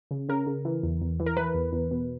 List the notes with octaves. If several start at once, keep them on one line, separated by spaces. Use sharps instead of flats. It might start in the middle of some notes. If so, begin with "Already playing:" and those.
C#3
C#3 A#4
C#3
E3
E2
E2
E3
A#4
E3 B4
E2
E2
B2